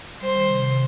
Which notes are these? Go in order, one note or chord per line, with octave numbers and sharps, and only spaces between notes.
G3 C5
D#3
C3
C3